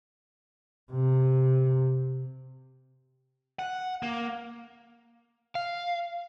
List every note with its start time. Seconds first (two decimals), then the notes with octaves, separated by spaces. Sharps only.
0.92 C3
3.59 F#5
4.03 A#3
5.55 F5